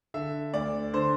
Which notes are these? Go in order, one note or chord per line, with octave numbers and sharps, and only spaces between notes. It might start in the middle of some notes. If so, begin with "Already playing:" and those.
D3 E5
D2 D5
D3 C5